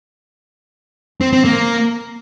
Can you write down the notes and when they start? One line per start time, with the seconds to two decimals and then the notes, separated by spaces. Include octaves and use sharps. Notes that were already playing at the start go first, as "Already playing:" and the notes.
1.21 C4
1.33 C4
1.45 A#3